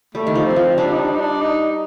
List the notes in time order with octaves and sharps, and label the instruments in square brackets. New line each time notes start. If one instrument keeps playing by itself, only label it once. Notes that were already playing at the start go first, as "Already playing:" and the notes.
[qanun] G3 [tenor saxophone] A3
[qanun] D#3
F3
[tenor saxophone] C4
[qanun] F3
[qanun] G3 [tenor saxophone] D4
[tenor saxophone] D#4
D4
D#4
D4
D#4